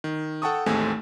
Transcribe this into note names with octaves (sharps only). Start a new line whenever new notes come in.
D#3
A4 F#5 G5 A5 C#6 D#6
A1 D#2 G#3 A3 C4 G#5